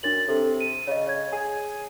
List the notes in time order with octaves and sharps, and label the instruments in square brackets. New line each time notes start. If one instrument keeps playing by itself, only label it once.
[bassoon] F#2 [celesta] D4 A6 F#7
[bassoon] C3 [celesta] A4
[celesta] D#7
[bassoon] C#3 [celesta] C#5 D#5
[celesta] C#5 G#6
[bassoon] G#4